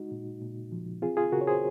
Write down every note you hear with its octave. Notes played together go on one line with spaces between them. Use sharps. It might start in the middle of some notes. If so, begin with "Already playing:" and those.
Already playing: G#3 D#4 F#4
A#2
A#2
F3
C4 F4 G#4
F4 G#4
C#3 F#4 A#4
C#5
G#4 C5